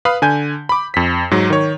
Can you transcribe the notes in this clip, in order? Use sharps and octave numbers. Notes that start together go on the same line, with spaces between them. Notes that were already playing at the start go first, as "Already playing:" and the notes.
B4 F5 B5 D#6
D3 G#5 G6
B5 D6
F2 B6
G#2 F#3
D#3 C#5